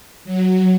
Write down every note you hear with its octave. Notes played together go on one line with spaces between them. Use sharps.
F#3